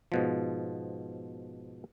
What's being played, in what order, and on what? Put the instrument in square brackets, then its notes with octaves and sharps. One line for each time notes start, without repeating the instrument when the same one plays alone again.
[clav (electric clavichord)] G#2 B2 F3